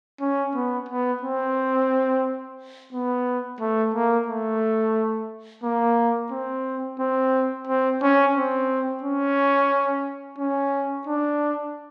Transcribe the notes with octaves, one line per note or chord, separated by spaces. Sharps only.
C#4
B3
B3
C4
B3
A3
A#3
A3
A#3
C4
C4
C4
C#4
C4
C#4
C#4
D4